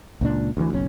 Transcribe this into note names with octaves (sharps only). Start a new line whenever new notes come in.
C#2 A#2 D4
D2 E3
F#1 B1 C#4